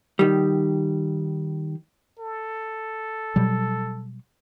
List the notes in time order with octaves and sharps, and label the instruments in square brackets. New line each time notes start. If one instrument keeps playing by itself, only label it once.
[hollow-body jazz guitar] D#3 G3
[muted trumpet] A4
[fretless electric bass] B2 F#3 G3